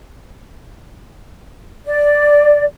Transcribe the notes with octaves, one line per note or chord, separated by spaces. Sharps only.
D5